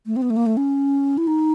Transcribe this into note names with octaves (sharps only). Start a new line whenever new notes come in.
A3
C4
B3
A3
A#3
A3
C#4
E4
D#4